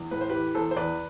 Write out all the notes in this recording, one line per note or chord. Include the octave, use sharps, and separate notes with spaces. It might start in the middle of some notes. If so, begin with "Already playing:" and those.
Already playing: E2
A2 B4
C5
E3 G4 B4
E2 A4 C5
C5
E2 B4 D5